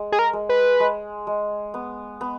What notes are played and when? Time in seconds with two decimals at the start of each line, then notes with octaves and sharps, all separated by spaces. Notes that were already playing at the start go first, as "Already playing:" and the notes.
Already playing: G#3
0.12 G#4
0.19 A#4
0.33 G#3
0.49 B4
0.80 G#3
1.27 G#3
1.74 B3
2.21 B3